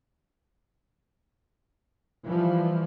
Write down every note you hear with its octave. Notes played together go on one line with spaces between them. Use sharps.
E3 F3 G3